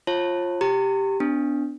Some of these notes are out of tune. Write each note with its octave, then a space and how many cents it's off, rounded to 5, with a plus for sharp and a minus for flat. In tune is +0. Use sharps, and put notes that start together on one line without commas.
F4 +0 C#5 -45 A5 +10
G4 +0 A#5 -35
B3 +40 D4 -5